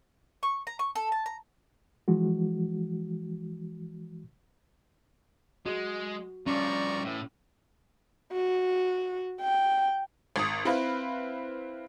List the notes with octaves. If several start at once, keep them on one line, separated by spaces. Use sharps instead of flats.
C#6
A#5
C#6
A4
A5
A#5
E3 F3 G#3 F#4
G#3 F#4
G2 F3 C#4 D5 A#5 C#6
A2 E3
F#4
G5
G#1 D#6
C4 E4 B4 F5